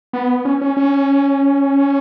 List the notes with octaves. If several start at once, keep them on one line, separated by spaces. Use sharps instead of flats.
B3
C#4
C#4
C#4